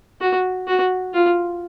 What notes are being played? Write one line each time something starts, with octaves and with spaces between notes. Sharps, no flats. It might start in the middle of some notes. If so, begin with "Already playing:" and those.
F#4
F#4
F4